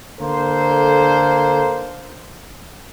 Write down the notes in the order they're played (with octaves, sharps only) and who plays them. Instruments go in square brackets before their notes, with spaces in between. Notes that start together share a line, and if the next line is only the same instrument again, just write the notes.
[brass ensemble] D3 A#3 A4 C5